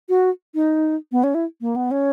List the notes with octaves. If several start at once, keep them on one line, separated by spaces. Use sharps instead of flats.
F#4
D#4
B3
C#4
E4
A#3
B3
C#4